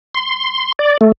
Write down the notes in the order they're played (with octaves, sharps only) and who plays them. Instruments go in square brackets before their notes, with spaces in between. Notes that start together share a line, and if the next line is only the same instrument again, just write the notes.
[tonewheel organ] C6
D5
A3